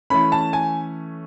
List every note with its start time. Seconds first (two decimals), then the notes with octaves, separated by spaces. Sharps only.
0.10 E3 A3 C#4 B5
0.32 A5
0.53 G#5